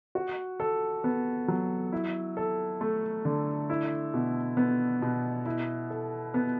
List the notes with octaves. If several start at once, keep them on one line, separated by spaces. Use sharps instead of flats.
F#4
A4
B3
F#3
E4
A4
A3
D3
E4
B2
B3
B2
E4
A4
B3